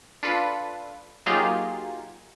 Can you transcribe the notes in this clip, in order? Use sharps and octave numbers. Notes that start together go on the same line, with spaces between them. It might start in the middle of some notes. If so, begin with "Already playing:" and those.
D4 F4 A4 B4
F#3 A#3 D#4 F4 G4 G#4